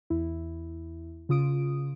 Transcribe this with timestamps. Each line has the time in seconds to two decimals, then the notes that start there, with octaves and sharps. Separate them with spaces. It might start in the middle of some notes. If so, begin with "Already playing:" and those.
0.10 E2 E4
1.29 C#3 F4 D#6 D7